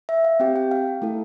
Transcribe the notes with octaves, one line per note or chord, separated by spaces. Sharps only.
E5
F5
C4 G4 G5
G5
F5
A3 E4 A4